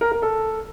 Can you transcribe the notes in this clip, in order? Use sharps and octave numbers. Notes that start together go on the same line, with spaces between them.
A#4
A#4
A4